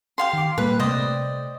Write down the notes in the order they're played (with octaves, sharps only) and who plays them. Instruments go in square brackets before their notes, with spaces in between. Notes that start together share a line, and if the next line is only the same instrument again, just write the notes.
[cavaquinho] G4 F5 C6
[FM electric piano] D#3 D6
[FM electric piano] A#2 G3 A#3 [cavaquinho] B4
[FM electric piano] C3 A3 G5 [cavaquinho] C5 D5 D#5